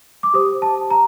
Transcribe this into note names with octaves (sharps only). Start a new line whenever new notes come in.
D6
G4 C5 D#6
A5
A#5